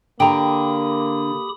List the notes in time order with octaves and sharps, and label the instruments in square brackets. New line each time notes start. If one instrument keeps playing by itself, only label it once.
[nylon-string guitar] D3 [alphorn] A#3 [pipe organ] G4 B5 D#6 [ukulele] G5 A#5